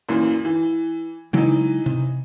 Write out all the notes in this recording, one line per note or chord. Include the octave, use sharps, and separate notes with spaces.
F#2 A#2 E3
E3
C#3 E3 F#3 G#3 D#4
C3